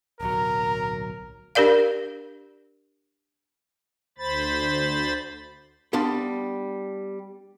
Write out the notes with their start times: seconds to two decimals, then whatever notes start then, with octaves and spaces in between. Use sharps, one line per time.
0.20 D1 B1 F#3 A#4 A#5
1.55 D4 G4 A#4 D5 F5
4.18 D2 C5 B5 A6
5.93 G3 B3 D4 F5 C6